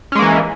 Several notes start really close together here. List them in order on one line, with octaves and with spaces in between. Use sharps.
C#4 G#3 A#3 E3